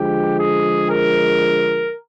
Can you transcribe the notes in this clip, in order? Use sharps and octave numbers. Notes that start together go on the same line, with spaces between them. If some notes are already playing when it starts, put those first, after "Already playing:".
Already playing: D3 F3 G#3 G4
G#4
A#4